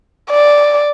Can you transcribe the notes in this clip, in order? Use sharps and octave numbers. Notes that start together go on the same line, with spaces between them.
D5